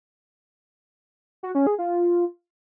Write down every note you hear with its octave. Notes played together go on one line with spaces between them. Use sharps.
F#4
C#4
G#4
F4